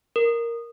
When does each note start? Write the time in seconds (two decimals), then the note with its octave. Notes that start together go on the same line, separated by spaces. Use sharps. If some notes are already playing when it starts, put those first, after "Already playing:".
0.16 A#4